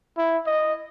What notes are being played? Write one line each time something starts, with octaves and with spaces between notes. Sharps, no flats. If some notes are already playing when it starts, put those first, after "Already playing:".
E4
D#5